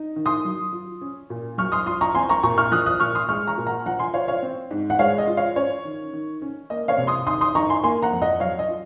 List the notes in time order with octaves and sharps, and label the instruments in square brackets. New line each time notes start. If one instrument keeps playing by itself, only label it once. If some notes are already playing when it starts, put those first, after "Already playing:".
Already playing: [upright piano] D#4
D#3
C6 D#6
F#3
F4
C#4
A#2
F#3 C#6 F6
C6 D#6
F4 C6 D#6
A#5 C#6
C4 G#5 C6
A#5 C#6
A#2 A#5 C#6
C#6 F6
F3 D#6 F#6
D#6 F#6
A#2 C#6 F6
C6 D#6
G#3 C#6 F6
A#5 C#6
A#2
F#5 A#5
F3 F#5 A#5
G#5 C6
F4 C#5 F5
C#5 F5
C4
G#2
F#5
G#3 C#5 F5
D#5
F4
C#5 F5
C#4 C#5
D#3
D#3
C#4
A#3 D#5
C#5 F5
C3
C6 D#6
D#3 C6 D#6
C6 D#6
D#4 A#5 C#6
G#5 C6
A#3 G#5 C6
F#5 A#5
F2
D#5 F#5
F#3 C#5 F5
D#5
F4